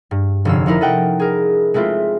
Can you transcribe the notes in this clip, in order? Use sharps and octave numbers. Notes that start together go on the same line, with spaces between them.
G2
F1 D3 C#4 F5 E6
F3 D#4 E4 A#4
A4 D#5 F#5 G5
G#4 A#4
G#3 A3 C4 E4 F4